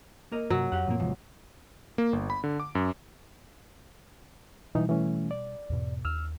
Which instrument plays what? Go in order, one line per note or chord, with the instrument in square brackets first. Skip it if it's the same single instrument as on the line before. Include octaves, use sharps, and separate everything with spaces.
[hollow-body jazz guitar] A#3 A#4 D#5
[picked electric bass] G2 C3 [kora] F#3
[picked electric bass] F2 [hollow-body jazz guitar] G4 F5 F#5
[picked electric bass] F#2 A#2 C4 [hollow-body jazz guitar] F3 A#3
[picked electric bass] D1 G1 C3 [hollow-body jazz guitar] E2 G#2 F3
[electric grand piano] A#3
G1
B5
D3
D6
F#2
[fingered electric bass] B2 G3 [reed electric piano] E3 D#4
[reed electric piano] E3 A3 C#4
D5
[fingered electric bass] E2 G#2 B2
[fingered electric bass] D#2 [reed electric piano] E6 F6